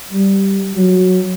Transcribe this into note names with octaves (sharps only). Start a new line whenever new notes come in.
G3
F#3